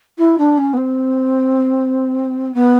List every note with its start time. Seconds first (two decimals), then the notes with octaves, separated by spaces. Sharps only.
0.18 E4
0.37 D4
0.57 C#4
0.73 B3
0.76 C4
2.54 B3